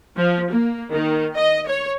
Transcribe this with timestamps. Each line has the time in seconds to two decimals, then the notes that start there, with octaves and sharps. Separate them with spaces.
0.17 F3
0.52 A#3
0.95 D#3
1.37 D#5
1.68 C#5